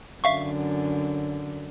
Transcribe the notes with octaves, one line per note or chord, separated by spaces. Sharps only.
F#2 D3 E5 F5 C#6